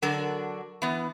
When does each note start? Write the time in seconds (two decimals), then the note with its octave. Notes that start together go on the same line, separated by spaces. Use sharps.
0.02 D3 F#3 D4 F#4 A4 A#4
0.82 E3 B3